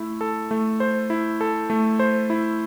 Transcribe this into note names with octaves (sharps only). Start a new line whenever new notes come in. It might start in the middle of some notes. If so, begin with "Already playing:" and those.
Already playing: A3 E4
A4
A3
C5
E4
A4
A3
C5
E4